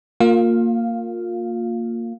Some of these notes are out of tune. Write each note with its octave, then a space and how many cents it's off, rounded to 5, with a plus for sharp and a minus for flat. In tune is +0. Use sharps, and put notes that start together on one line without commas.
A#3 -15 F4 +25 F5 +0